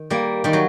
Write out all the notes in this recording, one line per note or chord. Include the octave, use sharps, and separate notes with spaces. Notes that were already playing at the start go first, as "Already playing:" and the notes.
Already playing: D#3
G3 A#3
D#3 G3
F#3